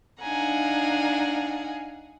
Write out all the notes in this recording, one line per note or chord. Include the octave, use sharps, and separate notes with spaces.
D4 D#4 F5 F#5 G#5 A#5